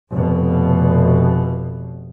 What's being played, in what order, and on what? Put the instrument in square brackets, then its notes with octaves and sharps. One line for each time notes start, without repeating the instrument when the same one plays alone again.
[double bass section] F1 B2